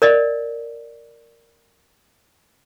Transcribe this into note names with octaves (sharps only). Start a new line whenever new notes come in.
A#4 D5 D#5